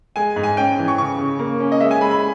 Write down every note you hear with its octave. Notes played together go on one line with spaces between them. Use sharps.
G#3 G#5
G#2
G#5
C#4 G5
E3
C#6
C#3 C#6
C#3
A#3
C#4
D#5
G#3 E5
G#5
G#3 B5
B5